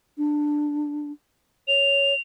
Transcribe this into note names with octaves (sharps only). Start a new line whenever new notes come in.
D4
C#5 F7